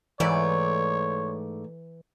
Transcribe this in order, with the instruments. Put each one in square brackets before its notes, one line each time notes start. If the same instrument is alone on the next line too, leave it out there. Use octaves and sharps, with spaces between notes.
[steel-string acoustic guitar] G#2 A3 D5 [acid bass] E3 [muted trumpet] C#5